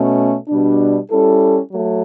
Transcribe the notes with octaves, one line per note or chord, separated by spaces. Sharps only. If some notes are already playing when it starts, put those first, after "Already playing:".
Already playing: B2 A3 C#4
B2 G3 D4
G3 C#4 E4 A4
F#3 A3